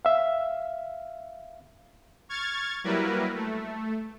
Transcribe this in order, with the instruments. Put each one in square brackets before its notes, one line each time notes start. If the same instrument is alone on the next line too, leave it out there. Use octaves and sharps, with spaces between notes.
[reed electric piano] E5 F5
[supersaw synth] C#6 F6 G#6 A6
F#3 G3 A#3 E4 A#4 B4
A3